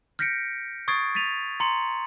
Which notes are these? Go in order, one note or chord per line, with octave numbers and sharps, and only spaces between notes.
F6 G6 A#6 B6 C#7 D7
C#6 D#6 G#6 A6 C7 D7
A6 B6 D#7 F7
A#5 C6 C#7 F#7